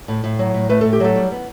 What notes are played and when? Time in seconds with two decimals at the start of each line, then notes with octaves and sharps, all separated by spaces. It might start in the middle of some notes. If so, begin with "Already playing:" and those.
0.08 A2
0.24 A2
0.39 F#3
0.54 A2
0.69 A3 B4
0.81 A2 A4
0.93 G4
1.00 F#3 A3 A4
1.16 G3
1.31 B3